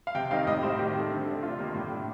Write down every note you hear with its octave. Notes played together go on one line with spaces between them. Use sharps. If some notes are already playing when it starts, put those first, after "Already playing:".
F5
C3 G5
D#3 G3 C4 D#4 F5
A2 D#5
G3 C4 C5
D#3 G4
A3 C4
D3
A3 D4
C3 F4
D#3 G3 A#3 D#4
A2
G3 D4